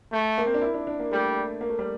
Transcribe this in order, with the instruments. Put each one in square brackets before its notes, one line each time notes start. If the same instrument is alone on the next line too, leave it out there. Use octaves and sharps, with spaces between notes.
[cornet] A3
[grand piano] A#3
C4
D4
E4
D4
D4
A#3
[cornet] G3 [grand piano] A3
[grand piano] A#3
A3
G3